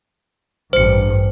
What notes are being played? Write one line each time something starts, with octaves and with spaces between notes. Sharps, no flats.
A1 G2 C5 C#7